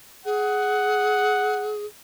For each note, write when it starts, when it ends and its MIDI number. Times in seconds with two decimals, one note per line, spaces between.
0.26 1.85 68
0.26 1.74 78